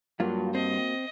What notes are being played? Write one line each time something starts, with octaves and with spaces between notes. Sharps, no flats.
G2 F#3 A#3 F4 F#4
C4 D#5